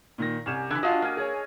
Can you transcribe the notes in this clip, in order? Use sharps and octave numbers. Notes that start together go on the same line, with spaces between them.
A#2 D#3 A#6
C2 C#4 G4 G#5 E7
D3 E3 E6 F#6 G#6
D4 F4 F#4 D#5
A#3 F5 G#5
G#4 C#5